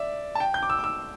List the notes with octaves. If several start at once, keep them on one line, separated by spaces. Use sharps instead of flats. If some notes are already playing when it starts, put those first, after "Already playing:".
Already playing: D5 E5
A5
G5
G6
D6
E6
D6
E6